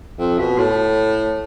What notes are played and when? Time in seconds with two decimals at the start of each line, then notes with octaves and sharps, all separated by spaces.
0.19 F2
0.39 B2
0.58 A2